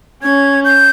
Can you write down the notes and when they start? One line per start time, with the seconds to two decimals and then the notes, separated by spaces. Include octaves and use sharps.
0.23 C#4 G#6
0.64 G6